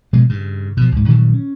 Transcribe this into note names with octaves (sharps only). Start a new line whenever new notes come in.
B2 F3 G#3
G2 C#3
B2 F3
C#2 G#2
A#2 D#3 F#3 G3
C#4